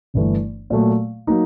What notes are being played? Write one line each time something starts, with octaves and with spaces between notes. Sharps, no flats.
G1 G2 E3 A3
A#2 F#3 A3
F#3 A#3 D#4